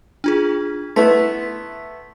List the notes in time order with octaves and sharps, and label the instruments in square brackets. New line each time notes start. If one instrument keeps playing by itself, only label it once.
[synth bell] D4 F4 G#4
[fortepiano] A3 B3 E4 [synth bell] C6 B6